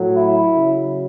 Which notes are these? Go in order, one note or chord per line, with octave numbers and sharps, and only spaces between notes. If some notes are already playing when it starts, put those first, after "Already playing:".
Already playing: A2 F#3
E4
C#3 F#3